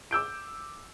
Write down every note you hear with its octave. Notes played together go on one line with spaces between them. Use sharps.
D6 E6 G6 D7